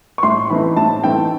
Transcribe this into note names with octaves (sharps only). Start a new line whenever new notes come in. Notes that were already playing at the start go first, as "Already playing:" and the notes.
C#6
A2 C6
E3 A3 C4 D#4 B5
A2 A5
E3 A3 C4 D#4 G5